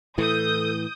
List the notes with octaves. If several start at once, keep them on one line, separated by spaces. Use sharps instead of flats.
A2 E3 A4 D#6 G6